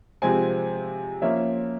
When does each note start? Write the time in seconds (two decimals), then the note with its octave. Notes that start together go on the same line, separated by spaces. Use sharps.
0.22 C3 F3 G#3 C4 G#5
1.22 F3 A#3 C#4 E5